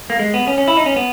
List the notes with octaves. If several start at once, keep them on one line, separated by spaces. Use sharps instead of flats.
A#3
G#3
B3
C#4
C#4
E4
D#4
C#4
B3